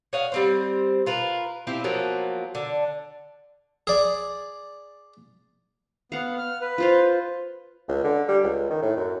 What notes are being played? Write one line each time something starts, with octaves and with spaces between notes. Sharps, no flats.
C#5 D#5 F5 F#5
G3 C4 C5
F4 A#4 B4
C4 E4 F4 G4
F3 F#3 A#3 B3
D3
G#4 D5
B3 F5 F#5
F6
B4
F4 C5 F5
C#2
D3
G3
C#2
D#3
A2
F#2